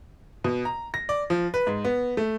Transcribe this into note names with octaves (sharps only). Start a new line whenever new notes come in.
B2
A#5
A#6
D5
F3
B4
G#2
B3
A3